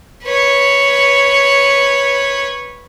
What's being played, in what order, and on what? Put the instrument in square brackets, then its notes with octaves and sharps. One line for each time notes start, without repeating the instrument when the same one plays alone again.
[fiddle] B4 C#5